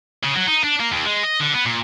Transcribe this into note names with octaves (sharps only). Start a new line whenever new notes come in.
C#3
F#3
D#4
D4
A#3
D#2
G#3
D#5
D3
B3
A#2